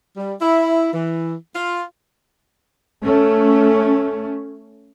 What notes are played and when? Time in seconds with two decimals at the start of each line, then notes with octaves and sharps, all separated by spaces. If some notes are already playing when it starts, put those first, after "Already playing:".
0.17 G3
0.41 E4
0.93 E3
1.55 F4
3.02 A3 C#4